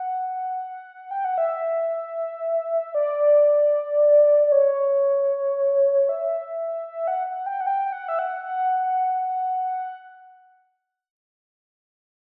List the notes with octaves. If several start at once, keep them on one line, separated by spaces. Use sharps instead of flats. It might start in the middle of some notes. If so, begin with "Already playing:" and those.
Already playing: F#5
G5
F#5
E5
D5
D5
C#5
E5
E5
F#5
F#5
G5
F#5
G5
F#5
E5
F#5
F#5